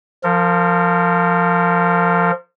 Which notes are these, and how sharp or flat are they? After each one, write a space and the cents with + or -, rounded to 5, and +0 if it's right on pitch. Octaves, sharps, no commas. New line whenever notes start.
F3 +0 A#4 -35